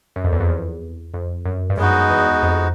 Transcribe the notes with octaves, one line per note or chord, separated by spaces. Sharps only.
F#2
F2
E2
F2
E2
F2
F#2
G2
F#2 G#3 B3 D#4 F#4
E2
F2